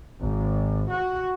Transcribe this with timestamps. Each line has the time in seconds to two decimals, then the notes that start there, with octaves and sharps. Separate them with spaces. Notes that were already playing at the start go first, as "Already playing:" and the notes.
0.21 G#1
0.90 F#4